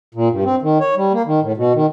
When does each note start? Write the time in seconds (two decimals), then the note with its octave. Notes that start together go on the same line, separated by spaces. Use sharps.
0.15 A#2
0.30 G2
0.44 C4
0.62 D#3
0.80 C#5
0.96 G3
1.13 A#3
1.26 D#3
1.42 A2
1.57 B2
1.74 D#3